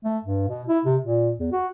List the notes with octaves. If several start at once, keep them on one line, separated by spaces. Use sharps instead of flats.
A3
G2
B2
E4
C3
A#2
E2
F#4